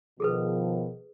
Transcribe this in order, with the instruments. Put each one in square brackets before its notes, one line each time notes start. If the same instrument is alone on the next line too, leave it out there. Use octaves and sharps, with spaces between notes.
[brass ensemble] B2 D#3 F3 [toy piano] G#4 A4 B4